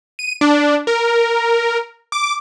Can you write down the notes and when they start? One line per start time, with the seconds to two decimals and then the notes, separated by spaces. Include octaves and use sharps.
0.19 D#7
0.41 D4
0.87 A#4
2.12 D6